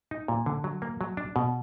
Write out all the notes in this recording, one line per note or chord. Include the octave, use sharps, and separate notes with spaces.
D#4
A#2
D3
F#3
A#3
F#3
D4
B2